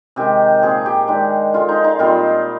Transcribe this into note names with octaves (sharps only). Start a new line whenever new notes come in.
C3 D#3 G#3 D#4 G4
A#2 F3 C4 G#4
G4
D#3 G#3 D4
D3 F3 G#3 F4
D#4
D#4
A#2 G3 C4 F4